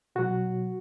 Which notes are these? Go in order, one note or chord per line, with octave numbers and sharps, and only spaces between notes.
B2 F#3 F#4